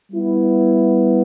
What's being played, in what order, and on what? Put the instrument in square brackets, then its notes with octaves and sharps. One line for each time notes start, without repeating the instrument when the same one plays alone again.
[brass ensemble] G3 B3 E4